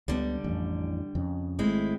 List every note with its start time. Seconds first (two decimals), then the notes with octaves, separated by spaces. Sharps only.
0.08 C#2 D3 G3 B3
0.44 A1 F2
1.15 F2 C#3
1.59 G#1 C3 G#3 A3 C4 E4